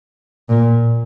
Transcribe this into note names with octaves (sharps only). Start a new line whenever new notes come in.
A#2